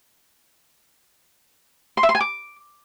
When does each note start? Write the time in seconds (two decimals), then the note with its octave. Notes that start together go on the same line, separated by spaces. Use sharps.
1.97 C6
2.03 E5
2.09 C6
2.15 G#5
2.20 D6